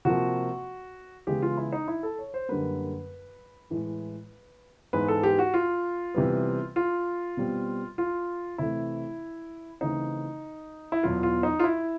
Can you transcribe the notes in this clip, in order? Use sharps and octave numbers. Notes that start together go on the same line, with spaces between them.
C3 F3 A#3 F#4
C#3 E3 G#3 B3 G4
F4
E4
D#4
E4
A4
C#5
C5
F#2 D3 G3 A#3 B4
A2 E3 G#3
G#2 E3 G#3 B3 B4
A4
G4
F#4
F4
C3 E3 G3 B3
F4
B2 G3 C4
F4
C3 E3 A3 E4
C#3 E3 A3 C4 D#4
E4
E2 B2 F#3 B3 F4
F4
D#4
F4
E4